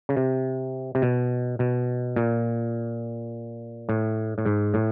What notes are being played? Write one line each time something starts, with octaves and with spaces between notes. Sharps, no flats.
C#3
C3
C3
B2
B2
A#2
A2
A2
G#2
A2